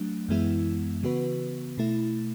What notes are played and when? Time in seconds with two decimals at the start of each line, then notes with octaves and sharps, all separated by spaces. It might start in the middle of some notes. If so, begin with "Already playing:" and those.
Already playing: F#3 A3 D4
0.28 F#2 E3 G#3 B3 E4
1.03 C#3 E3 B3 F#4 B4
1.78 B2 A3 E4